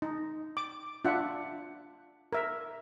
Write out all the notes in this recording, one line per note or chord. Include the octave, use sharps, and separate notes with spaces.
D#4
D6
D4 F4 E5 F#5
A#4 E5